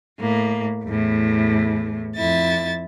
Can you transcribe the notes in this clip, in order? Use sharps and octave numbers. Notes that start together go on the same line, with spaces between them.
A2 A#3
E2 A2
F2 E4 A6